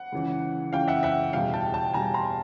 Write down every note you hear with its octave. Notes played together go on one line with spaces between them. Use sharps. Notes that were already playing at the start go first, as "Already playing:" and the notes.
Already playing: F#5
C#2 C#3 E3
C#2 C#3 E3 F5 G5
E5 F#5
E5 F#5
E2 B2 G3 F5 G5
G5 A5
G5 A5
E2 B2 G3 G#5 A#5
A#5 C6